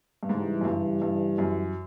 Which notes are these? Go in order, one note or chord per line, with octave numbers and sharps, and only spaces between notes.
G2
G#2 C#3 E3 G3
F#2
G2
G2
F#2